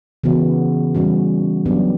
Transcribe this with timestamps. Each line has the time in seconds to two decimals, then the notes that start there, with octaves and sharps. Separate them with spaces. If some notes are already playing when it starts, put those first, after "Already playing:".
0.24 C#3 E3 B3 F#4
0.95 E3 G3 C#4 F#4
1.66 F#3 B3 D4 G4